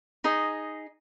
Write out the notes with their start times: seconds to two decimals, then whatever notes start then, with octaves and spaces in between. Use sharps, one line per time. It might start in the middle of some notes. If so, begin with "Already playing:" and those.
0.24 D#4 G#4 D#5